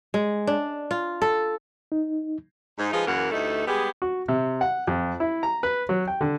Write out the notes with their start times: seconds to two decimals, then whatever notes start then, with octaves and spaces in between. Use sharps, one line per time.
0.14 G#3
0.47 D4
0.91 F4
1.22 A4
1.92 D#4
2.78 G#2 D#4
2.92 F3 G#3 D#4 F4 G#4 B4
3.06 F#2 C#3 E3 A#3 A#4 F#5
3.31 D2 G2 A3 D#4 E4 A4
3.67 G3 G#3 B3 G4 G#4
4.02 F#4
4.28 C3
4.61 F#5
4.87 F2
5.20 E4
5.43 A#5
5.63 B4
5.89 F#3
6.08 G5
6.21 D3